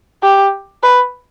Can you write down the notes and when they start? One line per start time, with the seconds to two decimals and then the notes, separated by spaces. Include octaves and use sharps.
0.23 G4
0.83 B4